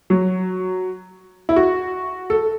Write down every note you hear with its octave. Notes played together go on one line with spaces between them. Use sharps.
F#3
E4
F#4
A4